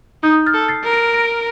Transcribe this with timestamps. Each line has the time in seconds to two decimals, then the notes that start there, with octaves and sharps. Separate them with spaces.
0.23 D#4 D#6 G6
0.46 F6 A6
0.54 A4
0.68 A6 C7
0.84 A#4
0.92 A#6 D7
1.14 A#6 D7